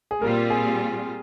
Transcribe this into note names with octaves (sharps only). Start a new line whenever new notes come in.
G#4
A#2 G3 C4 F4 A#4
G#4